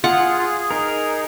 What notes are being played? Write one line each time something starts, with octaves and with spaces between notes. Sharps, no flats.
F4 G#4 F#5
D#4 A#4